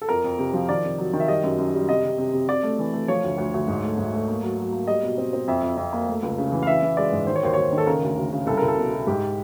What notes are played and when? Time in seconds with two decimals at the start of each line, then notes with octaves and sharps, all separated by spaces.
0.02 A4
0.09 F2 A#4
0.24 F2
0.39 C3
0.53 F3
0.69 D#3 D5
0.85 C3
0.98 F#3
1.13 D#3
1.20 E5
1.28 G3 D#5
1.43 F#2
1.58 F#2
1.74 G3
1.89 C3 D#5
2.04 C3
2.18 C3
2.33 C3
2.48 C3 D5
2.63 A3
2.79 E3
2.94 A3
3.08 F3 C#5
3.24 D2
3.38 D2
3.54 D2
3.68 G#2
3.83 A3
3.98 G#2
4.13 A3
4.28 A#3
4.43 F#3
4.59 F#3
4.73 A#3
4.87 G3 D#5
5.03 B2
5.18 C4
5.33 C4
5.48 F2 E5
5.63 F2
5.77 F2
5.93 A#3
6.08 A3
6.22 C#2
6.38 C#3
6.52 E3
6.63 F5
6.67 E3 E5
6.83 E3
6.97 G#3 D5
7.12 G#2
7.27 D#3 C5
7.36 C#5
7.43 D#2 C5
7.53 C#5
7.57 D#2 C5
7.73 D#3
7.78 A4
7.87 C#3 A#4
8.03 D2
8.17 D2
8.32 C#3
8.47 C2 A4
8.58 C2 A#4
8.68 A4
8.77 B2
8.92 B2
9.07 G#2 G4